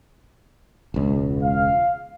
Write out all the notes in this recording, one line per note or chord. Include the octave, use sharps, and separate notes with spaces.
E1 C#2
F5